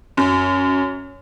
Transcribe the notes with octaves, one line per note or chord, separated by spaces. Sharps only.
F#2